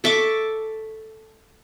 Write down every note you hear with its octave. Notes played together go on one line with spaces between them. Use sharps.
A4 E5 C#6 D6